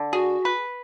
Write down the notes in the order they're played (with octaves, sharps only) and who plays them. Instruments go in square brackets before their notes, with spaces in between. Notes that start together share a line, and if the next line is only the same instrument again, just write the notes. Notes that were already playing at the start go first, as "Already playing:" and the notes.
Already playing: [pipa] D3
[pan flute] F#4 [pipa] G#4
[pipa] B4